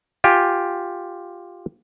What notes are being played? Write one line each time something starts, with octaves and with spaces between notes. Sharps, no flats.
F4 G4 G5 G#5